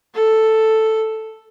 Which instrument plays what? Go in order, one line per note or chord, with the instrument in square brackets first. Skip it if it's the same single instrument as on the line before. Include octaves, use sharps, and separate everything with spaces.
[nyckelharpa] A4